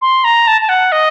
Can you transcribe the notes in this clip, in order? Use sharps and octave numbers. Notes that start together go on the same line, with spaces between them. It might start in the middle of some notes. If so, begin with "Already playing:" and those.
C6
A#5
A5
A5
F#5
D#5